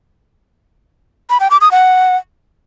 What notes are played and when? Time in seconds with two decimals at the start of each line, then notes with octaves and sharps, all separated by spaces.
1.30 B5
1.40 G5
1.51 D6
1.61 D#6
1.71 F#5